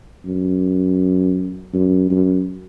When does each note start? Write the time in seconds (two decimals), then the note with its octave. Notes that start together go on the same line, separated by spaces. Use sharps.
0.25 F#2
1.73 F#2
2.10 F#2